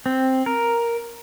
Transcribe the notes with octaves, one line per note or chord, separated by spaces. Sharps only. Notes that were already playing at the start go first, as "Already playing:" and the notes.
C4
A#4